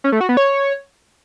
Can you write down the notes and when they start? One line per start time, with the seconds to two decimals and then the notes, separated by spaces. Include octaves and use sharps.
0.04 C#4
0.12 A3
0.21 F#4
0.29 B3
0.37 C#5